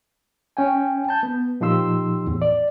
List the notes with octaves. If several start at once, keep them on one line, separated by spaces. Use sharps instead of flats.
C#4 G5 G#5
A5 G6
B3
A#2 F3 D#4 G4 C6 E6
E2 A2
D5